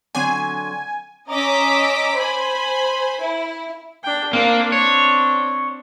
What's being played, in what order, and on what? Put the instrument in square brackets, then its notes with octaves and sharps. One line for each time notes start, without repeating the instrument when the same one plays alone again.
[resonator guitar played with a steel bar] D3 F#3 C4 [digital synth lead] G#5
[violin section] C#4 D#5 A#5 D6 E6 B6
C5 G#5 B5
E4
[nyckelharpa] D4 G5
[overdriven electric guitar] A#3 [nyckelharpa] C4 D4
[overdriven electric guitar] C#5